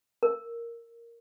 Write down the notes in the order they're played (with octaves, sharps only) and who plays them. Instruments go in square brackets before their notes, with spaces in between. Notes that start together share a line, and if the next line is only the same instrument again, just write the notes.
[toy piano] A#4